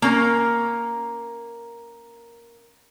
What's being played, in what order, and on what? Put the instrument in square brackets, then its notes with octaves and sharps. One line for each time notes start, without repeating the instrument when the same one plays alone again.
[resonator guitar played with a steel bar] A#3 C#4 A#4